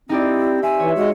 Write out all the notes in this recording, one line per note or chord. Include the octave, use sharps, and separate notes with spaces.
C4 D#4 E4 G4 D5
C4 E5 G#5
E3 C#5
G#3 F#4